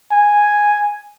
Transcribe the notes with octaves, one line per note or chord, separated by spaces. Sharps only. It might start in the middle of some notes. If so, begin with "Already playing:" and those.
G#5